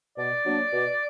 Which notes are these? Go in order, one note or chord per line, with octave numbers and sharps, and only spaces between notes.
B2 D5
F#3 A#3 D4
B2